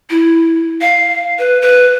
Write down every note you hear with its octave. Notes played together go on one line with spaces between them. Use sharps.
E4
F5
B4
B4